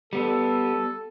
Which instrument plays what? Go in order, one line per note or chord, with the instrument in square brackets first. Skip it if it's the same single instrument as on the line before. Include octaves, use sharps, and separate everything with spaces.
[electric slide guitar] G3 B3 [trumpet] A4